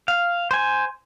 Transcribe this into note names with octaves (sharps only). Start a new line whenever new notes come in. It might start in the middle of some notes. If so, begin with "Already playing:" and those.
F5
C5 G#5